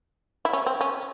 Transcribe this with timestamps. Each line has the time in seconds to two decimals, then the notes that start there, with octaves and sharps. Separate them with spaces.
0.45 E4
0.53 C#4
0.66 C4
0.81 C#4